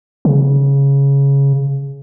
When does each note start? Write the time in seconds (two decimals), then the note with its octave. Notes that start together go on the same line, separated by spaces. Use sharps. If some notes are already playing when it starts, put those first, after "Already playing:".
0.25 C#3